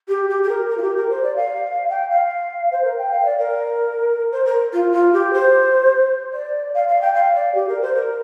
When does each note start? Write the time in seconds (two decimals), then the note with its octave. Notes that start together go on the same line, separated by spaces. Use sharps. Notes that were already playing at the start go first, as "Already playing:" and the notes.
0.08 G4
0.29 G4
0.42 G4
0.49 A#4
0.69 A#4
0.77 F4
0.82 G4
0.96 A#4
1.10 C5
1.23 D5
1.36 F5
1.89 G5
2.09 F5
2.71 C5
2.84 A#4
2.98 G5
3.11 F5
3.25 D5
3.38 A#4
4.32 C5
4.45 A#4
4.73 F4
4.92 F4
5.13 G4
5.33 C5
6.33 D5
6.74 F5
6.88 F5
7.01 G5
7.14 F5
7.35 D5
7.54 G4
7.68 A#4
7.81 C5
7.95 A#4